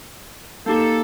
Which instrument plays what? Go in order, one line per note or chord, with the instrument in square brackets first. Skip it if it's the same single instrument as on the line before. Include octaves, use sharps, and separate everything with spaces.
[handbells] A#3 D#4 G4 [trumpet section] A4